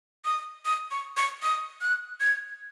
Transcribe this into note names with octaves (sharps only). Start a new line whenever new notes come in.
D#6
D#6
C#6
C#6
D#6
F#6
G#6